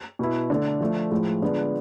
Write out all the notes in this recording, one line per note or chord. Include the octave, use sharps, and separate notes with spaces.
B2 B3 E4
D3 A3 D4 A4
F3 A3 D4
A2 F3 G#3
D3 G#3 B3 D4 F4